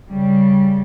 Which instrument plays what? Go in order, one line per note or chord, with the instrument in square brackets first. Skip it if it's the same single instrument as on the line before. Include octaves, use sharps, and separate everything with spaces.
[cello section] C#3 G3